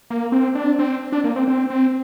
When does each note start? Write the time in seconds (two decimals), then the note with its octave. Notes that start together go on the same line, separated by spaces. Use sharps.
0.10 A#3
0.32 C4
0.55 D4
0.79 C4
1.12 D4
1.24 A#3
1.36 C4
1.48 C4
1.70 C4